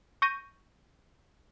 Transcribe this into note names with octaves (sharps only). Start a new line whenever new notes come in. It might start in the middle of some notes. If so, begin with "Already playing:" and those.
C#6 G6 A#6 D#7